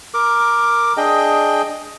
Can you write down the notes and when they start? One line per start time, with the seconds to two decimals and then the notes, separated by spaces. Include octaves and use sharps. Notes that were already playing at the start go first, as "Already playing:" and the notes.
0.14 A#4 D6
0.97 D4 G#4 D#5 G5